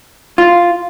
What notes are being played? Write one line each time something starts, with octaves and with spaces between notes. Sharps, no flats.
F4